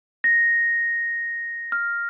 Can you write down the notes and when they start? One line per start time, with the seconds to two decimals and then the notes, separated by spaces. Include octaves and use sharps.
0.24 A#6
1.72 F6